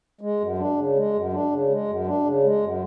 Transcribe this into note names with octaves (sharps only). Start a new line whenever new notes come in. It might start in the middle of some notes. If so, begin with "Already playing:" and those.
G#3
F#2
D4
C#3
G#3
F#2
D4
C#3
G#3
F#2
D4
C#3
G#3
F#2